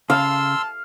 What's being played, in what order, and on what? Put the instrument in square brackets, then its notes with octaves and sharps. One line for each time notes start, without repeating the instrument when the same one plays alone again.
[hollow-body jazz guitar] C#3 [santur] F5 [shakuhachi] A5 [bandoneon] C6 E6